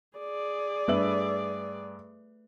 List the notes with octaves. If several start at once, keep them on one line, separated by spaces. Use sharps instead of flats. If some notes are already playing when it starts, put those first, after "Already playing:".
G#4 D5
G2 A3 B4 E5 E6 F#7